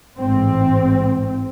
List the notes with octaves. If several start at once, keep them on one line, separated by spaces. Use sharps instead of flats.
A1 G#2 C4